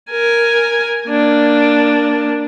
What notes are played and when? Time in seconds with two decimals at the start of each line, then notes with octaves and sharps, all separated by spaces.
0.11 A#4 G#5
1.07 A#3 D4